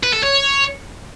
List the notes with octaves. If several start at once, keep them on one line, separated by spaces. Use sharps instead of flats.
B4
A4
C#5